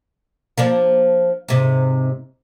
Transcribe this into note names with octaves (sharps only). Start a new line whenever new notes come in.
F3 A#3 D4
G#2 C3